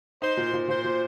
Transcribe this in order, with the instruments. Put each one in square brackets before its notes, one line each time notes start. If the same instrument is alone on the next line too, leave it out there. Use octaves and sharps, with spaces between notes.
[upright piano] D#4 [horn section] C5
[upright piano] A#2
A#2
[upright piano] A#2 [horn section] C5
[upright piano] A#2